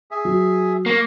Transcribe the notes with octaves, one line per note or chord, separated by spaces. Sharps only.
G#4 E5
F#3
A#3 C#6